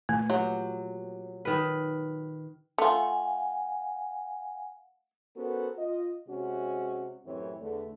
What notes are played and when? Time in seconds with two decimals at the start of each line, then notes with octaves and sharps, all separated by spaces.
0.09 A#2 E3 A3
0.30 F#3 G4
1.45 D#3 B4
2.78 A3 F4 F5 F#5 G#5
5.36 B3 C#4 F#4 A4 A#4 C5
5.77 F4 D#5
6.28 C3 G#3 C#4 F#4
7.26 F#2 A2 E3 C4 G4 C#5
7.59 E2 D3 A3